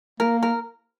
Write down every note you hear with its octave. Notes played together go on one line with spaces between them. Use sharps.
A#3 A#4
A#4